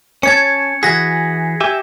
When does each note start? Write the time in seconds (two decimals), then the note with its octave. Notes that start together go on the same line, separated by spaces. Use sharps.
0.23 C#4 C#5 A5 G#6 C#7
0.83 E3 F#4 G#4 G#6 A#6 B6
1.61 G4 E5 G#5